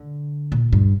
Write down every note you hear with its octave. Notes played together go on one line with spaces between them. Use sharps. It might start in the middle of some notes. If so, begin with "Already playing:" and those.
Already playing: D3
A#2
G2